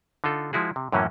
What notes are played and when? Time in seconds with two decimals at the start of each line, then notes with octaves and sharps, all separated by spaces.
0.24 D3 D#4 F4 A4
0.53 F3 G#3 E4 F#4 G#4
0.76 C3
0.92 F#2 A2 E3 F#3 A#3 C#4